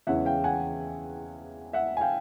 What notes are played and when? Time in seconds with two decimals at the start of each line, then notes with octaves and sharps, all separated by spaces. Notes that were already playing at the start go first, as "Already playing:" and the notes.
0.07 E2 C#3 E3 G#3 C#4 E5 F#5
0.25 F5 G5
0.44 F#5 G#5
1.73 E5 F#5
1.97 G#5
2.01 F5 G5